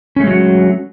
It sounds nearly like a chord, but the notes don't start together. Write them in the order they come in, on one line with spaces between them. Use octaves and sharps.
C#4 A3 G#3 F#3 F#4